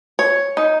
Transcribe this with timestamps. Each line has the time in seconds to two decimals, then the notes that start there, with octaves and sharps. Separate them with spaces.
0.19 C#5
0.57 D#4